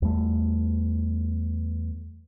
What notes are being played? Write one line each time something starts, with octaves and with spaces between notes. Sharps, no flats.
E2 G3 A3